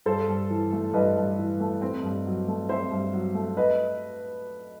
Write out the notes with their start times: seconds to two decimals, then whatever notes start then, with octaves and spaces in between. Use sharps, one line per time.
0.06 G2 A4 C5
0.28 G2
0.50 E3
0.73 A3
0.93 G2 B4 D#5
1.16 G2
1.38 E3
1.60 A3
1.82 C4
2.03 G2
2.26 F#3
2.48 A3
2.69 C4 C5 E5
2.91 G2
3.13 F#3
3.35 A3
3.57 B4 D#5